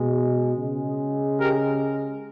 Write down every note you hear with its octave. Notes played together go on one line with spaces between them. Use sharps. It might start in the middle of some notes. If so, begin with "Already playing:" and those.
Already playing: B2 G#3
C#3 G#3
G4 A#4